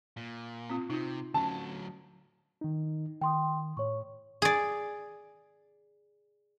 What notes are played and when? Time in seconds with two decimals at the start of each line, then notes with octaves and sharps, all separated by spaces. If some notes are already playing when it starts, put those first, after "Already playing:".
0.17 A#2
0.70 C4 F4
0.90 C3 D#4 F4
1.34 D2 F#3 C#4 A5
2.61 D#3 D#4
3.21 D#3 G5 C6 D#6
3.77 A2 C#5 C#6
4.42 G#4 D5